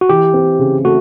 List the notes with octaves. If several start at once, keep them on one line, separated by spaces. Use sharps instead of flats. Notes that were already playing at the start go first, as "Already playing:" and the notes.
F#4
E3 G4
C4
C#3
A3 F#4